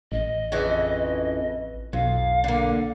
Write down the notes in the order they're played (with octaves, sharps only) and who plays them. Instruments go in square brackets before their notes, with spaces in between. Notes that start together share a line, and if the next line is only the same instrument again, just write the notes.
[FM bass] A1 [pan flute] D#5
[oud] F2 C#3 E3
[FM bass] B1 [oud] F2 [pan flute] F5
[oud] D3 A#3